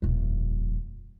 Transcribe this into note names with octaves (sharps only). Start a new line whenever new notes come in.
D#1 F2